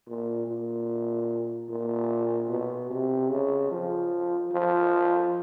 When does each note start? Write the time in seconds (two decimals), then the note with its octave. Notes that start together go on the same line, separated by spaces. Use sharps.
0.08 A#2
0.48 A#2
1.70 A#2
2.50 B2
2.90 C3
3.30 C#3
3.71 F3
4.52 F3